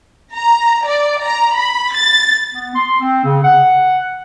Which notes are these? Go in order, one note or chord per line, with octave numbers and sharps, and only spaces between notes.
A#5
D5
A#5
B5
A6
B3
C6
C4
C#3
F#5